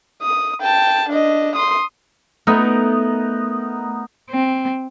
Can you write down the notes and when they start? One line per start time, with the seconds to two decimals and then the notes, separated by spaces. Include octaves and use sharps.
0.22 D#6
0.61 G5 A5
1.10 D4 D#5
1.56 C6 D#6
2.47 A3 B3 D#4 A#4
4.30 C4